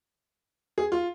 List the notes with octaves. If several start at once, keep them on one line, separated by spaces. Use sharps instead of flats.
G#4
F4